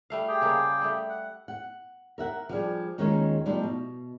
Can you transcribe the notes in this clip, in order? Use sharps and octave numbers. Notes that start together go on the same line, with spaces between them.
G3 A3 F5
G4 G#4 G5
C#3 G3 A#3
G3 A3
F#5
F#5
A#4 E5 F#5
F3 G3 D4 G#4
D#2 D#3 G#3 C#4 D#4 F4
F3 G3 A3 B3 D4 D#4
B2